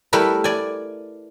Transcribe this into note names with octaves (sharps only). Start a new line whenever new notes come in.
G3 A3 E4 A#4 B4
D5 G#5